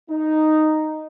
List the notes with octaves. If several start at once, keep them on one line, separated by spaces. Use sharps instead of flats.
D#4